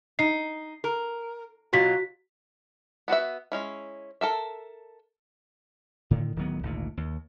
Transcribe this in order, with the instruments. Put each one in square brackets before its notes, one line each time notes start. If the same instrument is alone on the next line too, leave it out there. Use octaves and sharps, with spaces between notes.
[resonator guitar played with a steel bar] D#4 [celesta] C7
[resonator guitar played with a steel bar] A#4
[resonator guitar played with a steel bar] B2 F#3 F4 [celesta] F#4 B6
[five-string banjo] B3 F#4 B4 E5
G#3 C#4 E4
A4 A#4 E5
[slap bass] A2 D3 D#3
D1 D#3 F#3 B3
G#1 D2 A#2
D#2